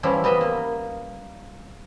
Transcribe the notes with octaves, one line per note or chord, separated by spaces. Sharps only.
E3 F3 G3 C#4 E4
G3 B3 D#5 E5
A#3